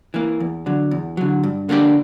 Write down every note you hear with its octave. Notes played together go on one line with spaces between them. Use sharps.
E3 A#3
E2
D3 F#3
E2
D3 F#3
G2
D3 A#3 D4 G4